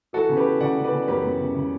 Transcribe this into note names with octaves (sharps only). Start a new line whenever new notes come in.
E3 F#4 A4
C#3
G4 B4
E3
C#3 D5 F#5
C#3
B4 D5
C#3
F#2 G4 B4
F#2
C#3
C#3